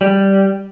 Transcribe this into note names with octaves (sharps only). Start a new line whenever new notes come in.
G3